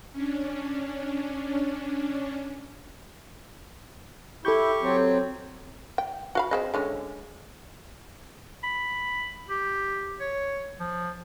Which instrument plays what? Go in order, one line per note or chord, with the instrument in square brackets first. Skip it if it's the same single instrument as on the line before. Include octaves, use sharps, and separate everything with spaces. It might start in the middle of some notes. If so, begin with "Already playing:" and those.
[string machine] C#4 D4
[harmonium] E4 [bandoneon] G4 C#6 [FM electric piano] A4 G6
[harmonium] F#3 C4
[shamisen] G5
F#4 F5 B5
C4 G#4 D#5
D3 G#3 C#4
[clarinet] B5
G4
C#5
F3